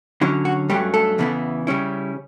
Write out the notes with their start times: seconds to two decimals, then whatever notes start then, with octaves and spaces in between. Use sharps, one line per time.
0.21 D3 F#3 C#4 E4
0.45 F#4
0.70 G2 F#3 G3 A3 C#4 G4
0.94 A3 A4
1.18 E2 C#3 E3 B3 E4
1.67 C#3 G3 C#4 E4